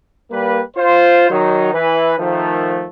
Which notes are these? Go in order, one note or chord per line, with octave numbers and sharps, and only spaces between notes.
G3 A#3 B4
F4 C5
D#3 F#3 D#4
E3 B4
D#3 F3 A3